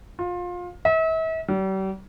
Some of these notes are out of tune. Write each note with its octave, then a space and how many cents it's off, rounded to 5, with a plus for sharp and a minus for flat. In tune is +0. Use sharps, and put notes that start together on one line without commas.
F4 +25
E5 -40
G3 -40